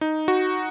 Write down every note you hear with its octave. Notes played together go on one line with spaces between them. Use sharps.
D#4
F#4